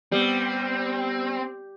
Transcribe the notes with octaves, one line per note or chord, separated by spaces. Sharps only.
G3 B3 C4 G4